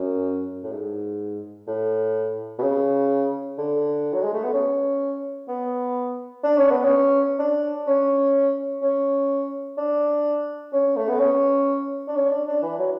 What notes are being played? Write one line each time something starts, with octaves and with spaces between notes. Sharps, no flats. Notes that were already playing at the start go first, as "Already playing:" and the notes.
Already playing: F#2
A2
G#2
A2
B2
C#3
D3
F#3
G#3
A3
B3
C#4
B3
D4
C#4
B3
C#4
D4
C#4
C#4
D4
C#4
A3
B3
C#4
D4
C#4
D4
D4
E3
F#3